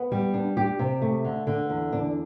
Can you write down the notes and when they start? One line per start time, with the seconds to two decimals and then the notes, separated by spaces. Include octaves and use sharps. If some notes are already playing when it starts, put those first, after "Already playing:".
Already playing: B3
0.12 G3
0.34 D4
0.57 G4
0.79 C3
1.02 A3
1.25 D3
1.47 D3
1.70 E2
1.93 D4